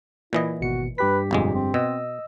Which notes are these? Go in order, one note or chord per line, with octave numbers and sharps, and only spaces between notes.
A#2 E3 E4 D#5
G#1 B2 F#4 C#7
G2 G4 B4 B6
G1 F2 A#2 G#3
C4
B2 D#5 E6